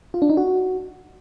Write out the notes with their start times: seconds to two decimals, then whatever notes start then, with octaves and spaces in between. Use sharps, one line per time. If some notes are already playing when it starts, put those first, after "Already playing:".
0.14 F4
0.22 D4
0.30 D#4
0.37 F#4